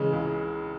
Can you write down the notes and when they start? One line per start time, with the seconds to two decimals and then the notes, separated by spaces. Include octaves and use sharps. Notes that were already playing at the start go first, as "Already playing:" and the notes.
Already playing: C#3 E3 G#3
0.13 C#2